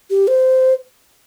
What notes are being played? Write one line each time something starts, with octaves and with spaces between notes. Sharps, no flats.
G4
C5